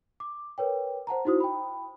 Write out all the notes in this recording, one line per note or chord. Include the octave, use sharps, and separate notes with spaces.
D6
A#4 B4 C#5 G5
C5 F#5 A5 A#5
D#4 E4 F#4 C5 D#6
G5 B5